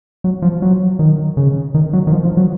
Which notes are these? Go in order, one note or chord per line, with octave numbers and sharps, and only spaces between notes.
F#3
F3
F#3
D#3
C#3
D#3
F#3
D#3
F3
F3
F#3